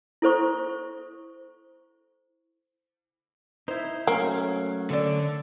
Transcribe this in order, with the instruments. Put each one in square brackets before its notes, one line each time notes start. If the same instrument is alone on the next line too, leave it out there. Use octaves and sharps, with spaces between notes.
[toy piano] E4 A4 C5 C#6
[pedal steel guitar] D#4 E4 [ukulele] C5
[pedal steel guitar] F#3 A3 C#4 [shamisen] A#3
[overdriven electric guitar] D3 [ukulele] A4 D5